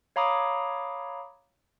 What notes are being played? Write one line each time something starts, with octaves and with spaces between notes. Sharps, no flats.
C#5 F5 A#5 B5 D6 D#6